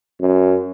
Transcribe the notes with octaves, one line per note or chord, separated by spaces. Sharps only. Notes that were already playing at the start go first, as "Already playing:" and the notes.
F#2